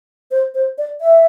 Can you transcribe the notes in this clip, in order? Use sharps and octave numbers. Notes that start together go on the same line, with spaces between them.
C5
C5
D5
E5